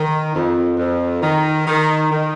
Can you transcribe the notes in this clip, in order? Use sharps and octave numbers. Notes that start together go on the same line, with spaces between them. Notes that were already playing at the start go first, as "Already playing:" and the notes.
Already playing: D#3
F2
F2
D#3
D#3
D#3